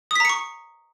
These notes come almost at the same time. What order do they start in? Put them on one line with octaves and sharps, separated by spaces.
D#6 B6 A#5 C#7 C#6